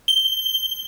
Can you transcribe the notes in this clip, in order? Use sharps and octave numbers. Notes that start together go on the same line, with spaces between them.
G7